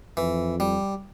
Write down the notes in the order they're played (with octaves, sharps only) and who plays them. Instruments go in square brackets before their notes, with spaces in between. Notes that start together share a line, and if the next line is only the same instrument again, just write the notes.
[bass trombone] F2 [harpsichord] E3
[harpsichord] G3